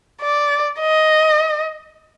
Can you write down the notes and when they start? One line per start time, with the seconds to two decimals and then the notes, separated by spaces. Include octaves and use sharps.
0.21 D5
0.80 D#5